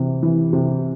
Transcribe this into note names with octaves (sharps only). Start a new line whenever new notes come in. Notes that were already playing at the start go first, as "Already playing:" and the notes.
Already playing: C3 E3
E3
C3